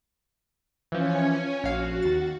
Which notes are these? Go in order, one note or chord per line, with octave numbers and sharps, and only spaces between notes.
E3 F3 C#4 C#5 G#5
A#1 F#4 F5
D#2 A6